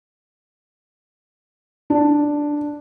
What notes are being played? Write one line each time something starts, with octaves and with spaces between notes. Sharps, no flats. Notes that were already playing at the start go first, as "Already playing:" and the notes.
D4